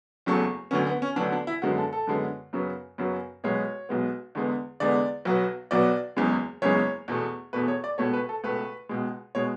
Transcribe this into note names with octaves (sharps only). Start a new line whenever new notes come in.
F#1 E2 C#3 F#3 A3
D2 D3 F#3 B3 C#4
B3
C#4
D2 D3 F#3 B3 D4
D4
E4
F#2 D3 G#3 B3 F#4
A4
A4
F#2 D3 G#3 B3
F#2 C#3 F#3 B3
F#2 C#3 F#3 B3
B1 B2 G#3 B3 C#5
B1 B2 G#3 B3
E2 D3 G#3 B3
E2 D3 G#3 B3 D5
B1 B2 F#3 B3
B1 B2 F#3 B3 D5
F#1 E2 C#3 E3 G#3
F#1 E2 C#3 E3 G#3 C#5
E2 B2 A3
E2 B2 A3 B4
C#5
D5
C#2 B2 A3 C#5
B4
A4
C#2 B2 A3 B4
C#2 B2 G#3
B2 G#3 C#5